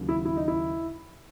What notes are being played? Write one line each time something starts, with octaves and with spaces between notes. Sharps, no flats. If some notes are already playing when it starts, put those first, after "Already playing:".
Already playing: D#2 C#3 F#3
E4
E4
D#4
E4